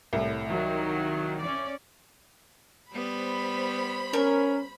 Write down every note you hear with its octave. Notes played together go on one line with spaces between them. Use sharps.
C2 A2
D#3 F#3
C#4 D5
G3 B3 C5 B5
C#4 A#4